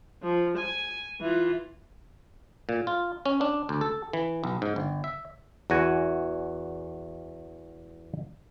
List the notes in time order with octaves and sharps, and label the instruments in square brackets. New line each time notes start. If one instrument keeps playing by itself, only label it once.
[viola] F3
G#5
E3 F4
[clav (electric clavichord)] A#2
F4
C#4
D4
D2
A4
E3
B1
G#2
G1
E5
E2 E3 F#4 G#5